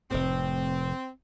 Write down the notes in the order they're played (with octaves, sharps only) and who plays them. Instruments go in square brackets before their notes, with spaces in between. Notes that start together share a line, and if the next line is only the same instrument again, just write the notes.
[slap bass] F1 A2 [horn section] C4